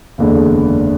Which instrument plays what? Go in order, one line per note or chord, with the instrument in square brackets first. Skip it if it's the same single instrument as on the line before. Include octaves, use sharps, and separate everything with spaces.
[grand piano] F#1 E2 D3 G#3